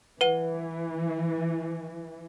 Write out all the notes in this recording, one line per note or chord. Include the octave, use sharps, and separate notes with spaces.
E3 B4 F#5 D#7